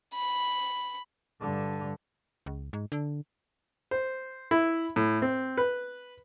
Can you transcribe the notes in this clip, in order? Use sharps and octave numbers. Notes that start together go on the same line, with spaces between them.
B5
G2 D3
C#2
G#2
D3
C5
E4
A2
C4
B4